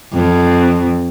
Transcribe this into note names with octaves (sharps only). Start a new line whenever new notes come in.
F2